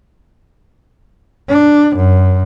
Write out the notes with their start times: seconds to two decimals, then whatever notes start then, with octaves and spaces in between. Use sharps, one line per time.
1.49 D4
1.96 F#2